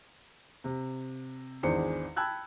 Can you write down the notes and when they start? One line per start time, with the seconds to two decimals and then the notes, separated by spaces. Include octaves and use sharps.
0.64 C3
1.63 G#1 E2 D4 G#4 C5 C#7
2.16 G5 A5 B5 E6 F#6 G#6